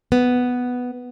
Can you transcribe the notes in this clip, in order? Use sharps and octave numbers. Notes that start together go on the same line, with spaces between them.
B3